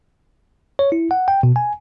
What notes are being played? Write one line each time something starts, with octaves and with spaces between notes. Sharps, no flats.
C#5
E4
F#5
G5
B2
G#5